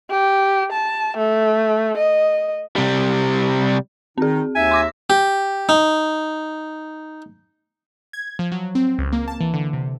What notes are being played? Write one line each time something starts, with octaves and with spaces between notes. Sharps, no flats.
G4
A5
A3
D#5
C3 G3
D#3 C4 D#4 G#4
D#2 D#4 E5 G#5
C6 D6 A#6
G4
D#4
G#6
F3
F#3
C4
C#2
A#3
A5
E3
D3
C3